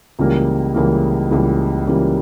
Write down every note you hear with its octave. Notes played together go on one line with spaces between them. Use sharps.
C#2 C#3 E3 G3 A#3
C#2 C#3 E3 G3 A#3
C#2 C#3 E3 G3 A#3
C#2 C#3 E3 G3 A#3